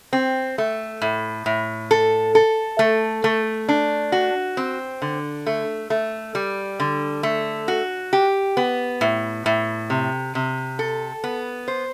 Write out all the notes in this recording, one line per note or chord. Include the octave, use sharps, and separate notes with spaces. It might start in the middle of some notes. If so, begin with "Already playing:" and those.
C4
A3
A2
A2
A4
A4
A3
A3
D4
F#4
C4
D3
A3
A3
G3
D3
A3
F#4
G4
B3
A2
A2
C3
C3
A4
B3
C5